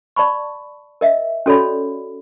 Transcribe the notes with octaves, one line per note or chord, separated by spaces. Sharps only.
D5 A5 B5 C#6
A#4 D#5 E5
C#4 F#4 A4 C#5 D5 B5